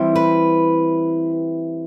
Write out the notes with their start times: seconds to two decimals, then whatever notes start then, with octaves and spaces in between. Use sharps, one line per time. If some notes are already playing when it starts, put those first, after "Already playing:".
Already playing: E3 G3 C4 E4
0.15 B4